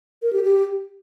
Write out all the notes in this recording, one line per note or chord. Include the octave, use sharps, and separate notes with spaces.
A#4
G4
G4